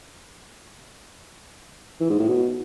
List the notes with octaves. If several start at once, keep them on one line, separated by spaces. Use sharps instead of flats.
E3
G#2
A2
B2